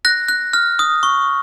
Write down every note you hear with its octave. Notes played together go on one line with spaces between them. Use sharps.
F#6 A#6
F#6
F6
D#6
C#6